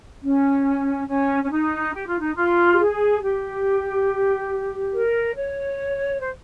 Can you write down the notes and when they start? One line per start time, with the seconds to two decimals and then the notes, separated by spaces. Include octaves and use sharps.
0.22 C#4
1.07 C#4
1.43 C#4
1.50 D#4
1.93 G4
2.06 F4
2.20 D#4
2.33 F4
2.72 G4
2.78 G#4
3.21 G4
4.91 A#4
5.35 C#5
6.20 C5